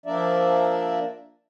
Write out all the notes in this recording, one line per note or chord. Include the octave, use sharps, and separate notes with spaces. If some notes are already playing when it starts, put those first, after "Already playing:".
F3 A#3 D4 A#4 D5 E5